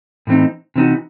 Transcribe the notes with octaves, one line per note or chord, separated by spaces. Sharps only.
A2 E3 C4 D#4
C3 E3 C4 D#4 F#4